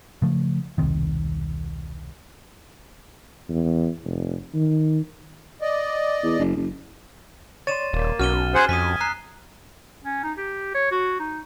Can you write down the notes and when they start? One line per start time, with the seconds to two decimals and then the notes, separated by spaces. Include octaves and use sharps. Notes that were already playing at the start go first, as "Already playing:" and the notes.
0.22 C#3 F3 A3
0.78 E1 C2 C3 D#3
3.49 E2
4.04 F1
4.54 D#3
5.61 D5 D#5
6.24 E2
6.39 F#1
6.56 F#1
7.67 C#5 D5 C6 A6 D#7 E7
7.93 D#1 A#3
8.19 B1 C#4 F#4 F6 D#7 G7
8.54 G#4 C5 F#5
8.69 F2 G#5 D#6 B6
9.01 A#5 F#6 C7
10.03 C#4
10.24 D#4
10.38 G4
10.75 C#5
10.91 F#4
11.20 D#4